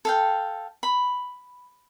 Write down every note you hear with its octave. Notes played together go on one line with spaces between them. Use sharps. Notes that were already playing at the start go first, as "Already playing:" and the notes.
A4 F5 G5
B5